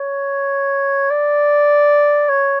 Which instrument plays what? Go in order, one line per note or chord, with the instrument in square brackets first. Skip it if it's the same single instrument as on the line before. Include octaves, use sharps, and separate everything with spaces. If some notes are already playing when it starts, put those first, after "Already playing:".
Already playing: [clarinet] C#5
D5
C#5